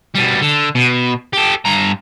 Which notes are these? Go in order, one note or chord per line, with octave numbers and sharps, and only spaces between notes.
B2 G3
D3
B2
G4 A4
G2 A#5